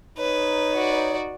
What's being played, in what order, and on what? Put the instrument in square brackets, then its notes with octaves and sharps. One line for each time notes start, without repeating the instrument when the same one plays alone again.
[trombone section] D#4 [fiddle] B4 [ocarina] C#5
[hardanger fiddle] F#4 D5